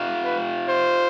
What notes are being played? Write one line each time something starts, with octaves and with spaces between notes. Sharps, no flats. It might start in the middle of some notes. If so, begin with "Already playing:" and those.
Already playing: F4 G4
B4
C5